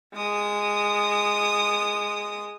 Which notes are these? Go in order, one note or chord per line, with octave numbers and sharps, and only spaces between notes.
G#3 D#6